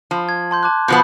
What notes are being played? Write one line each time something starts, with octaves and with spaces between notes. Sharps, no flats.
F3 A5
G#6
A5 C6 G6
A5 D6 F#6
B2 F3 B3 D#6 F#6 G6